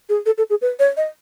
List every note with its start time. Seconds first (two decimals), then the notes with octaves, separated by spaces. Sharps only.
0.09 G#4
0.26 A4
0.38 A4
0.50 G#4
0.62 B4
0.79 C#5
0.97 D#5